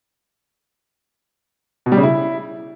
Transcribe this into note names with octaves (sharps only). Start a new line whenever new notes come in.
B2
G3
C#3
E4